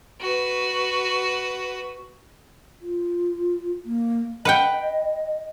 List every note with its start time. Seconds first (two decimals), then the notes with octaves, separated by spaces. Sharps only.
0.21 F#4 B4
2.82 F4
3.86 A#3
4.45 B4 D#5 F#5 G5